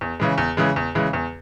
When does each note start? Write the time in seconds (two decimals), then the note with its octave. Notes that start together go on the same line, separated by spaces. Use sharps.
0.01 E2
0.20 C#3 E3 G#3
0.38 E2
0.57 C#3 E3 G#3
0.76 E2
0.95 C#3 E3 G#3
1.13 E2